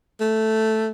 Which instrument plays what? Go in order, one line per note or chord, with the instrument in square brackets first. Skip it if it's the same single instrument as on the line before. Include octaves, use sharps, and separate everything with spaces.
[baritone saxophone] A3